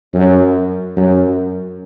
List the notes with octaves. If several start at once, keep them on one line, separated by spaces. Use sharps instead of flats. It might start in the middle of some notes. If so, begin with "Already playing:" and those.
F#2
F#2